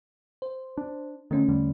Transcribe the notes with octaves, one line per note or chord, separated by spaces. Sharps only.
C5
D4
D3 D#3 A3 C#4
E2 D3 G3